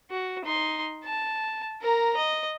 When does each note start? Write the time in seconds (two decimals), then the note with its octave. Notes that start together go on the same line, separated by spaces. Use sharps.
0.11 F#4
0.45 D#4 C6
1.04 A5
1.82 A#4 A#5
2.17 D#5